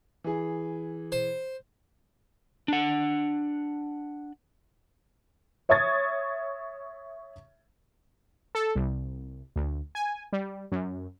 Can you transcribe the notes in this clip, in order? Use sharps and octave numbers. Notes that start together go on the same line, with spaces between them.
E3 G#4
C5
D4 F#5
C#5 E5 C#6 D#6 G#6 A6
A4
C2
D2
G#5
G3
F#2